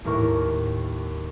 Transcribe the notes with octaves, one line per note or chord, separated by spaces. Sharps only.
D#2 A2 A#4 C#6